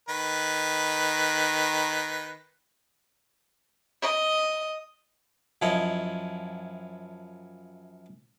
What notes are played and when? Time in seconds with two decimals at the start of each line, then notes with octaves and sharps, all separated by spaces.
0.09 D#3 B4
4.01 D#5
5.62 F#2 F3 E4 C#5 D#5